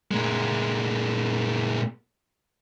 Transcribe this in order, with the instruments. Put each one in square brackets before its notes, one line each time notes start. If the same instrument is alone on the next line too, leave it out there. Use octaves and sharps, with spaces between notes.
[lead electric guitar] A#2 G#3